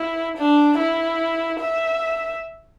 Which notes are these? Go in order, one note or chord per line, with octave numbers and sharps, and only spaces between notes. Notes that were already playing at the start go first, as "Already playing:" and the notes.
Already playing: E4
D4
E4
E5